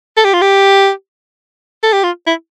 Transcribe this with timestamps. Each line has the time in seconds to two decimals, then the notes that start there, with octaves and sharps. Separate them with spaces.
0.17 A4
0.25 G4
0.33 F4
0.42 G4
1.83 A4
1.93 G4
2.04 F4
2.27 E4